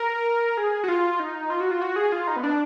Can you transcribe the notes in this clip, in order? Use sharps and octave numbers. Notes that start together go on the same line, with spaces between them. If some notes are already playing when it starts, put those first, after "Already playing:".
Already playing: A#4
G#4
F#4
F4
D#4
F4
F#4
F4
F#4
G#4
F4
D#4
B3
D4